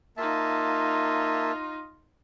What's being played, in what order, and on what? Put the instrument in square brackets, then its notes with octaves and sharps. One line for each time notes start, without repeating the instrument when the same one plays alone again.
[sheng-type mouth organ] A#3 E5 A5 [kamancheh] D#4 F4